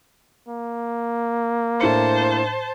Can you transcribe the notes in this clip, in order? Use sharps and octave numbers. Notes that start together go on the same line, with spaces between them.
A#3
A2 D4 C5 A5 C#7